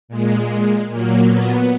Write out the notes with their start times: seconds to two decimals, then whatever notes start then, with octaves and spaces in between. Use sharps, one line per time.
0.08 A#2 G#3
0.88 A#2 F#3 A#3
1.28 B3